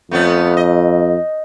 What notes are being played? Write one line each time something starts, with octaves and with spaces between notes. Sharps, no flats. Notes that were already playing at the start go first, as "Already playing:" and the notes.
F2 A3 B3 C#4
D#5